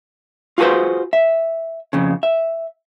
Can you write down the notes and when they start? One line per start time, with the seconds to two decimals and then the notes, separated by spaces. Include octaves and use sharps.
0.58 F4 F#4 G#4 A4 B4 C5
1.13 E5
1.93 F2 C#3
2.23 E5